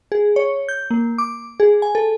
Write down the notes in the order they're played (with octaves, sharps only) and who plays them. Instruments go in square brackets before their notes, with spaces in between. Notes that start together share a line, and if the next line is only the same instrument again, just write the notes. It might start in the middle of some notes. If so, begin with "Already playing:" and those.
[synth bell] G#4
C#5
G6
A#3
D6
G#4
G#5
A4